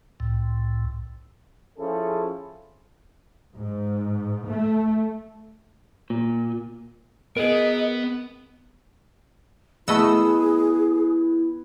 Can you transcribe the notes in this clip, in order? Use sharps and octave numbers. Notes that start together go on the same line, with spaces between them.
C2 A2
F3 C#4 E4 G#4 A4
G#2
A3
A#2
B3 G#4 A#4 D#5
A3 B3 E4 G#4 D#5 E6